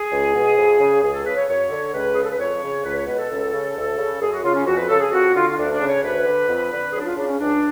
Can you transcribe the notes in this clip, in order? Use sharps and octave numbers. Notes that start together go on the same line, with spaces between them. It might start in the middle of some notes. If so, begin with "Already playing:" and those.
Already playing: G#4
C#2
B2
F2
C#3
C#2 G#4
A4
C#3 B4
C#5
F#2 C#5
D3
C#2 B4
C#3 G#4
A4
B4
F2 C#5
C#3
C#2 B4
C#5
B2 B4
A4
C#2
C#3
D2
C#3
F#2 G#4
F#4
C#3 F4
C#4
F2 F#4
B4
C#3 A4
G#4
F2 F#4
D3 F4
F4
D2 D4
D4
C#3
C#5
D2 B4
D3
F2
D3
F#2 G#4
D4
F4
C#3 D4
C#4
C#2 D4